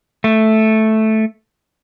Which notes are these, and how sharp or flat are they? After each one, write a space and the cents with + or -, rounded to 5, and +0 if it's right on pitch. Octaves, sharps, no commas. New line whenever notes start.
A3 -5